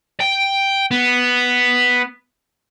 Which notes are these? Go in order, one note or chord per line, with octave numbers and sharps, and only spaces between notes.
G5
B3